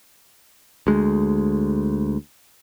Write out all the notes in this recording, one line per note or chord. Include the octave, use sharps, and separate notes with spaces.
D2 G#3